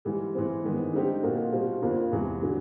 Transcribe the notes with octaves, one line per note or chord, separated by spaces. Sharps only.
G#2 E3 G3
E3 G#3 C4
G2 D#3 G#3 B3 D#4
D3 G3 C4 D#4 G4
A#2 F3 A#3 D#4 F#4
B2 G3 C4 F4
F2 D3 F3 A#3 D4
E2 C3 E3 G#3
D3 F#3